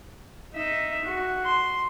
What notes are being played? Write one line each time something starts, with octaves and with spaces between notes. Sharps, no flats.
D#4 E5
F#4
C6